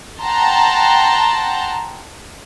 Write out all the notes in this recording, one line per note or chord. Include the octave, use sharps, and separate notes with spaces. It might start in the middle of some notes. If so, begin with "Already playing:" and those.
F#5 G5 A5 A#5 C6